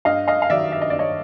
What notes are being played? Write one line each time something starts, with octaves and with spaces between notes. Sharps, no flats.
G2 D#5 F5
D#5 F5
F5
D#3 F#3 D5 E5
E5
D#5
D5
G2 C#5 D#5